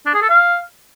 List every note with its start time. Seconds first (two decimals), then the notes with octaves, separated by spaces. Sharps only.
0.06 D4
0.14 G#4
0.22 A4
0.30 F5